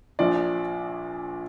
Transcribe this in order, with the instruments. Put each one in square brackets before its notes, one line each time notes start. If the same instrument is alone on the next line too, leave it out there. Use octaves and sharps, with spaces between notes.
[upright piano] A#1 A#2 F3 D5